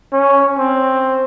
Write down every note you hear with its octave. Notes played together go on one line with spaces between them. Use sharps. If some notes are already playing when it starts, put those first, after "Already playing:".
C#4
C4